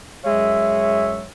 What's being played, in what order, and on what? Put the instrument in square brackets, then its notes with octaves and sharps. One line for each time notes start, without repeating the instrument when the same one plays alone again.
[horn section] F#2 G#3 C#5 E5